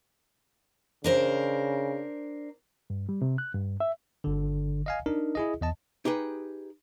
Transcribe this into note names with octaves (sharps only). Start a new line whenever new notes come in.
C#3 D4 A#4 C5
G2
G3
C3
F#6
G2
E5
G1 D3
D#5 F5 G#5
D4 D#4 A#4
E4 G#4 D#5
E2 D#5 A5
D#4 G4 G#4 B4